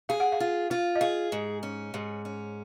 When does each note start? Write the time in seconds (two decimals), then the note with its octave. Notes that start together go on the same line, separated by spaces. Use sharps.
0.09 G#4 F5
0.20 F#5
0.32 F5
0.40 F4
0.70 F4 F5
0.95 D#5
1.01 G#4 F5
1.32 G#2
1.63 C#4
1.94 G#2
2.25 C#4